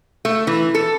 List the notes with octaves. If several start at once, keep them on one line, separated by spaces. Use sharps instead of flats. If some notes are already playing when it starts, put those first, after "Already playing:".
A3
E3
A4